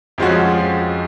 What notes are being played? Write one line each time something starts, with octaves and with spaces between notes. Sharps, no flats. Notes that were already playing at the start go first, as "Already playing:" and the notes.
F2 F3 G#3 C#4 F#4